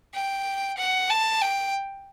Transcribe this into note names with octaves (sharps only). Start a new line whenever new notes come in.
G5
F#5
A5
G5